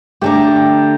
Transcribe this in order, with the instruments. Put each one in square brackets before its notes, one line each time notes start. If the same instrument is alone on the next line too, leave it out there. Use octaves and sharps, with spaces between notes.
[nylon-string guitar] D3 A3 [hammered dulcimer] G4 A5 A#5